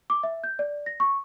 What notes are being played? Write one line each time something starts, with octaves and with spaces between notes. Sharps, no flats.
D6
E5
G6
D5
A#6
C#6